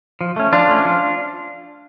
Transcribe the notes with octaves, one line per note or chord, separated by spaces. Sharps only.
F3
A3 C#4
F3 D4 F4
A3 C#4
F3